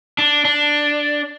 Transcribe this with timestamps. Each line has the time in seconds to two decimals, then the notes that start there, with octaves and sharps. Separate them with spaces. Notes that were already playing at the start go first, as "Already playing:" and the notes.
0.18 D4
0.45 D4